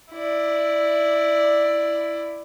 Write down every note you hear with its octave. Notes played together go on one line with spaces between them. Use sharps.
E4 D5